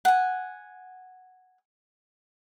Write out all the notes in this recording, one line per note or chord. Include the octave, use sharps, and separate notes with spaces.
F#5 G#5